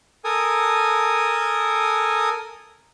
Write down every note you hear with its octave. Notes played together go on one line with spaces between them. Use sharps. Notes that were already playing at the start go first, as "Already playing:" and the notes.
A4 A#4 G#5 D#6